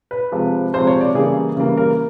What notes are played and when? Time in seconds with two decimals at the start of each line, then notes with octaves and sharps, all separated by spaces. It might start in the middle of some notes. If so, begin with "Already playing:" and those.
0.11 B4
0.32 C3 F3 G#3
0.74 C3 F3 G#3 C5
0.87 C#5
1.01 D5
1.15 C#3 E3 G3 A#3 G#4
1.56 C#3 E3 G3 A#3
1.77 A#4